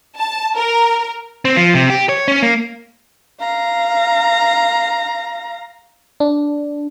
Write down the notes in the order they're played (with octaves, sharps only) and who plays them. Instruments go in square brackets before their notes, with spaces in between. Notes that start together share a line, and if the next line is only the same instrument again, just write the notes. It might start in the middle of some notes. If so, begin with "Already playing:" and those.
[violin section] A5
A#4
[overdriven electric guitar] C4
F3
C3
G4
C#5
C#4
A#3
[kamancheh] F5 A#5
[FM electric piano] D4